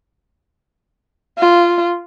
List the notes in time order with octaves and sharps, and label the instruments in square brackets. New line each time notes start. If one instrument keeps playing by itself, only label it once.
[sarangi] F4